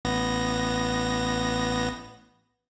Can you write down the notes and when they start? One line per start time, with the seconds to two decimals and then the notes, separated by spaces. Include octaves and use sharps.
0.05 A1 B3 A#6